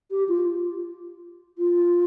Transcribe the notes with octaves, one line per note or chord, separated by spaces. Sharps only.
G4
F4
F4